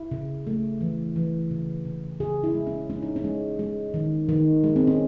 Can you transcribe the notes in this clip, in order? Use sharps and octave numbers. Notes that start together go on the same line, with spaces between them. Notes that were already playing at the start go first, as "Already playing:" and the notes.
Already playing: E4
C#3
A3
E3
E3
C#3
C#3
C#3 G#4
E4
G#3
C#4
G#3 C#4
D#4
C#4
G#3
G#3
D#3
D#3
G#3
C4
C#4